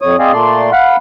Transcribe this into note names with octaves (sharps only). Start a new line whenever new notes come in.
F2 C#5 D#6
C4 G#4 D5 D#5 F5
A#2 A3 D5 C6
F5 F#5 B5